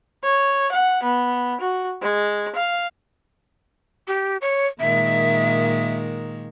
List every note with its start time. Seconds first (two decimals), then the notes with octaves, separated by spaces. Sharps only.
0.23 C#5
0.72 F#5
1.03 B3
1.60 F#4
2.02 G#3
2.55 F5
4.07 G4
4.41 C#5
4.80 A#2 D#3 G#3 E5